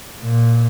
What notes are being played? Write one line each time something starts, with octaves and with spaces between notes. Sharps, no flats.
A#2